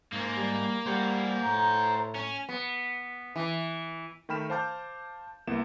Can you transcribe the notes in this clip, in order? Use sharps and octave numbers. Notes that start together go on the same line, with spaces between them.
G#2 A#3
G3
G3 C5 F#5
A2 A#5
C#4
B3
E3
D#3 A3 G5 B5 F6 E7
C5 F5 A5 D6 F6 G6
C2 A#3 B3 E4 E7